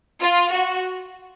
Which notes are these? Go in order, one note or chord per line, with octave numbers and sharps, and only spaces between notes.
F4
F#4